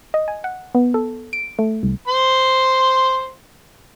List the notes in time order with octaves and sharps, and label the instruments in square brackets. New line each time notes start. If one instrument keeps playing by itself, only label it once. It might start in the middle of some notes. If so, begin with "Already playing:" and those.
[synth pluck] D#5
G#5
F#5
B3
A4
D7
A3
C2
[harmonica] C5 C6